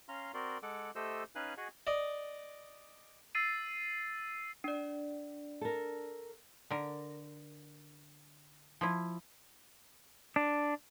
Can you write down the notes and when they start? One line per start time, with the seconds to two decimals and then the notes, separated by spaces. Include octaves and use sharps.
0.08 C#4 F5 A#5 C6
0.34 C4 F#4 A#4 D5 C6
0.63 G#3 A4 F#5 D6
0.95 A3 G4 A4 C5 D#5 E6
1.35 C#4 D#4 B4 F5 G#5 F#6
1.57 F#4 G#4 D#5 F#5 G#5
1.87 D5 D#5
3.35 E6 A6 C7 D#7
4.64 D4 D5
5.61 A4 A#4
6.70 D3 A#4
8.81 F3 E4
10.36 D4